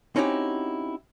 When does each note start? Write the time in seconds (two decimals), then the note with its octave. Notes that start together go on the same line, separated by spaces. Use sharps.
0.16 C4 C#4 D#4 E4 F#4 G4